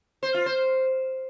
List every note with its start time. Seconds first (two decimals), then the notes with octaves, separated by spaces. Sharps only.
0.23 C5
0.34 F4
0.46 C5